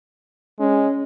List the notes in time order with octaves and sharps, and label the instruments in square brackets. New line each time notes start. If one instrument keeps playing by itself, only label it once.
[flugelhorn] G#3 [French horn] C#4